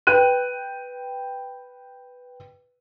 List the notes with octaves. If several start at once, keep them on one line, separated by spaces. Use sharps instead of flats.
B4 G5 F#6 D#7